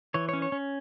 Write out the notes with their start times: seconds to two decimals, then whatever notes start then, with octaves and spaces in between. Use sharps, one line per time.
0.14 E3 C#5
0.29 C#5
0.33 C#4
0.42 C#5
0.52 C#4